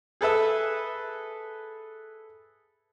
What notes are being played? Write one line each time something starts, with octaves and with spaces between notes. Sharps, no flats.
G#4 A4 B4 E5 D#6